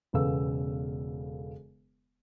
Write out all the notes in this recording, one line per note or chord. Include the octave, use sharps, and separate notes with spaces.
E1 C#3 B3 A4 F5 E6